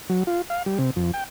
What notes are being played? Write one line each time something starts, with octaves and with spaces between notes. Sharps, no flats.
F#3
F4
F5
G3
C3
F2
G5